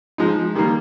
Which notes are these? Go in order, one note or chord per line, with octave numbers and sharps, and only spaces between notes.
F3 G#3 D#4
D#3 G3 A#3